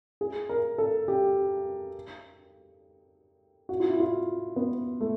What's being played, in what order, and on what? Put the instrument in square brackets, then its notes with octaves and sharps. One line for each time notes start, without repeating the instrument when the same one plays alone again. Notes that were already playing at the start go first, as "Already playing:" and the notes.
[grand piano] G#4
A#4
A4
G4
F#4
F4
E4
F4
B3
A3